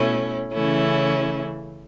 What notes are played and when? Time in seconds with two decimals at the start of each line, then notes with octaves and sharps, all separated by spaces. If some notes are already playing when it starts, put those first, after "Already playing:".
Already playing: B2 A3 C#4 E4
0.53 C#3 E3 A3 C#4 E4